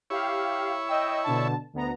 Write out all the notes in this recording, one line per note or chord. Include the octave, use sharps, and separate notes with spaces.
E4 G4 C#5 F5
D#5 G5 E6
B2 D3 A5
D2 B3 A#5